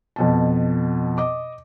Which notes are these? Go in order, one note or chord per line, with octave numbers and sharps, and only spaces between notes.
F2 B2 A5
D#5 D6